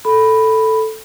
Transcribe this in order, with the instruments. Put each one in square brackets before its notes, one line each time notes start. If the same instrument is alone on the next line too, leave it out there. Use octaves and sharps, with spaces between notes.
[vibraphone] A4 B5